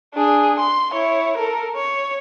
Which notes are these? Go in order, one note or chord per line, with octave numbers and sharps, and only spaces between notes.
D4 G#4
C6
E4 C#5
A4 A#4
C#5